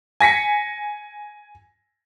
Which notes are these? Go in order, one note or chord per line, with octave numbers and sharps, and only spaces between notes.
G#5 A#6 B6 C#7